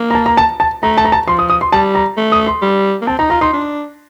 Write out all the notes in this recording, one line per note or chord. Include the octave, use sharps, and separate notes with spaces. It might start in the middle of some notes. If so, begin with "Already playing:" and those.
Already playing: A#3
A#5
A5
A#5
A5
A5
A3 A#5
A5
A#5
A5
F3 C6
D#6
D#6
C6
G3 A5
A#5
A3
D#6
C6
G3
A#3
C4 A5
D#4 A#5
F4 A#5
D#4 C6
D4